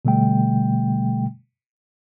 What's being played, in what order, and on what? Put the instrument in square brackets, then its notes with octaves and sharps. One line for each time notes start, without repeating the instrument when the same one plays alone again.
[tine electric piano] B2 D3 G3 A3 G5